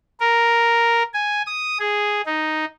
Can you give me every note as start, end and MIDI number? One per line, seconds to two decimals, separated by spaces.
0.20 1.03 70
1.14 1.42 80
1.46 1.78 87
1.79 2.21 68
2.26 2.65 63